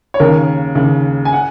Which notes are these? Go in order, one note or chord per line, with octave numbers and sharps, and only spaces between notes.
C#5
D#2 C#3 A#4
D#2 C#3
G#5
F#5